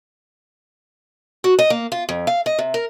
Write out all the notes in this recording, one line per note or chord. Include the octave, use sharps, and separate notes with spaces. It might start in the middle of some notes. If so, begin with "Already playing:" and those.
F#4
D#5
A#3
F4
F2
F5
D#5
C3
A#4